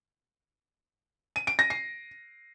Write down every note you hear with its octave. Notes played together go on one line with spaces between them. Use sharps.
D#7
D7
A#6
C7